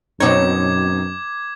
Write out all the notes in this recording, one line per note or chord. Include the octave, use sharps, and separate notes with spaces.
F#2 B2 C4 D#4 F#4 C#5 D6 G#6